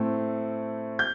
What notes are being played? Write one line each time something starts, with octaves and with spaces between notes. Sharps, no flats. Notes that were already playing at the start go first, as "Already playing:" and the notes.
Already playing: A2 A3 C4
G6